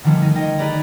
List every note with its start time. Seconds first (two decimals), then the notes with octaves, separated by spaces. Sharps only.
0.04 D3 D#3 F3 G3 A3 C#4
0.22 D#3 D#4
0.35 C#5 D#5 G5
0.59 D#4 G4 G#4 B4 D5 A#5